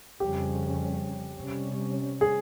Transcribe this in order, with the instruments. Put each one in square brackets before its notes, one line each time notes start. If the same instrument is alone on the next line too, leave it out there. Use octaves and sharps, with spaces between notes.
[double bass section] F2 C#3 G3 C#4 [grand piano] G4
[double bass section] C3 G3 C#4
[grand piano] G#4